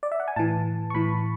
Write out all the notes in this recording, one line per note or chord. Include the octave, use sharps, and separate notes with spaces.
D5
E5
F#5
G#5
A2 E3 A5
C#6
A2 E3 B5